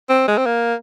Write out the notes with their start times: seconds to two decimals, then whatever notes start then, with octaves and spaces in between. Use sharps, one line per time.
0.10 C4
0.28 G#3
0.38 C4
0.46 A#3